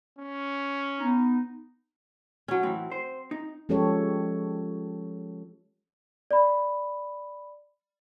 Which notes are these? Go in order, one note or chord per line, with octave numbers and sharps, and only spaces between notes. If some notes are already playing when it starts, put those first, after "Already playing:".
C#4
B3 D#4
F#3 C#4
A2 E3 C4
C5
D#4
F3 G#3 C#4 G4 A4 C#5
D5 B5